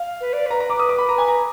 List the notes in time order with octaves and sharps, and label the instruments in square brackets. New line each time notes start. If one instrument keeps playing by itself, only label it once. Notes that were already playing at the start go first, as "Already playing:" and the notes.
Already playing: [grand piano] F5
[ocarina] B4
D5
[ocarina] B4 [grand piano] A#5
[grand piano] A#5
D6
D#6
D6
B5
[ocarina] B4 [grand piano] A#5
[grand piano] G#5
A#5